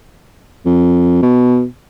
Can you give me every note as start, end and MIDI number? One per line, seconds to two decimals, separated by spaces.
0.66 1.18 41
1.23 1.65 47